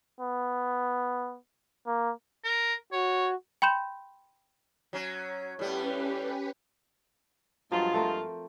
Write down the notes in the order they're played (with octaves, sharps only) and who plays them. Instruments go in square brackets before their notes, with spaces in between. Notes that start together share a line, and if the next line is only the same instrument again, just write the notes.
[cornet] B3
A#3
[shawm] A#4
[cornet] F#4 [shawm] C#5
[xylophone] G5 B5 C6 G6 E7
[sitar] F#3 C#4
[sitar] A2 G3 B3 [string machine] C#4 G4 B4
[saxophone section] G2 G#3 F4 [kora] F3 F#3
[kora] A3 C4 A#4